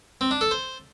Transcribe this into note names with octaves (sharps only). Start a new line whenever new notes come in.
C4
D4
A4
C5